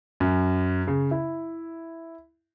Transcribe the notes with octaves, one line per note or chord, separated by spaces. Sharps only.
F#2
C#3
E4